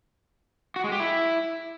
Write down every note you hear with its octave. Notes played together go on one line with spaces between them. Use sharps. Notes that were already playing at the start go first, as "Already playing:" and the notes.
F#4
G#3
G4
E4